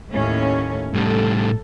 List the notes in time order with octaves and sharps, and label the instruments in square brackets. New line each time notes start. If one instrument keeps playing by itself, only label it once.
[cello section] D#2 A2 C#4
[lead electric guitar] A2 G3 [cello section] A4